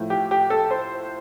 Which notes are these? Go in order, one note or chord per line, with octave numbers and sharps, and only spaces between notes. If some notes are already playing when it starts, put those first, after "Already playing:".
Already playing: A2 F3 A3
G4
G4
A4
C5